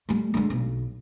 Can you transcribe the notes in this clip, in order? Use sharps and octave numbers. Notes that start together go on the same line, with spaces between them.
G3 A3
D3 G#3
B1